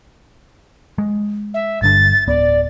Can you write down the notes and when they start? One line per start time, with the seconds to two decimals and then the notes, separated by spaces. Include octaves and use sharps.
0.98 G#3
1.54 E5
1.82 G1 G2 D3 A6
2.27 D1 B3 D5